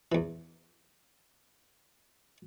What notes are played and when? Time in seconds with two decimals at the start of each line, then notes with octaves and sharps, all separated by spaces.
0.12 E2 E3